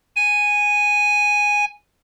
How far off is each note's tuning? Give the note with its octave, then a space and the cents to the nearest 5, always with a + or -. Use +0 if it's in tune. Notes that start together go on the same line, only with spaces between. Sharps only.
G#5 -5